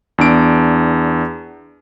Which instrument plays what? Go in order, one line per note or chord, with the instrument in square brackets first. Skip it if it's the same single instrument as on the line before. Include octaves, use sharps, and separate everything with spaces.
[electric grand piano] E2 D4 D7